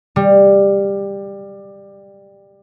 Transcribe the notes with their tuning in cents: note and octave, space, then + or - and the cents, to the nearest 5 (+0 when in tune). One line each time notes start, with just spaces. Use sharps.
G3 +15